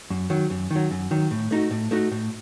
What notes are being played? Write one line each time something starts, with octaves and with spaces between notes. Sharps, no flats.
F#2
D#3 F#3
F#2
D#3 F#3
F#2
D#3 F#3
A2
A3 D#4 F#4
A2
A3 D#4 F#4
A2